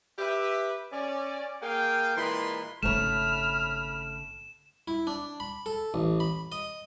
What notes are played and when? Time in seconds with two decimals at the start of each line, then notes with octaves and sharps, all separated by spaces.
0.19 G4 B4 E5
0.92 C#4 D5
1.62 A#3 G#4 F5 G5
2.16 A#2 E3 G#3 B5 C6
2.83 G#1 C#3 A3 C#5 B5 F6 E7
4.88 E4
5.07 D4
5.40 B5
5.66 A4
5.94 A1
6.20 B5
6.52 D#5